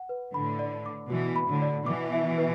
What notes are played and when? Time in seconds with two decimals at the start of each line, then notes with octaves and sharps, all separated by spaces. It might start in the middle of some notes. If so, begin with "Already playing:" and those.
Already playing: F#5
0.09 B4
0.34 A2 D3 B5
0.59 D5
0.86 D6
1.10 B2 E3 F#4
1.36 B5
1.49 A2 D3
1.62 D5
1.86 B2 E3 D6
2.13 E5
2.38 B4